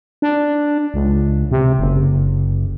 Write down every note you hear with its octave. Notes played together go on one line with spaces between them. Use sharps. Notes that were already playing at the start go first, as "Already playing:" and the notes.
D4
C#2
C3
F#1